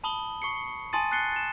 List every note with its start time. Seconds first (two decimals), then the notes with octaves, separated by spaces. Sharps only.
0.04 A5 B5 D#6 F#7 G7
0.42 C#6 C7 C#7
0.93 G#5 A5 C6 D#6 A6 D#7
1.12 F#6 A6 C7 C#7 G7
1.32 A6 E7